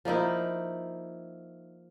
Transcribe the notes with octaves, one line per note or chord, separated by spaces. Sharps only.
F3 A#3 D#4 E4